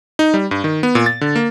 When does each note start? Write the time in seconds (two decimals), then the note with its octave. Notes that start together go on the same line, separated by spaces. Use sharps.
0.19 D#4
0.34 G3
0.51 G2
0.64 D#3
0.83 B3
0.95 A#2
1.06 A6
1.21 D3
1.36 A#3